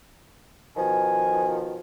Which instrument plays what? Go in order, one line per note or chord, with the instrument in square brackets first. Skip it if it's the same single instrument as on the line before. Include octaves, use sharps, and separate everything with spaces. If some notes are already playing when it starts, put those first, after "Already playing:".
[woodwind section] B2 D#3 F3 [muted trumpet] G#5